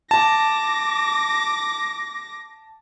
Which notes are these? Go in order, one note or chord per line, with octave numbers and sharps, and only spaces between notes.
A5 D6 A#6